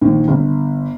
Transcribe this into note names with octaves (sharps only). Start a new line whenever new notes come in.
A#1 D#3
G1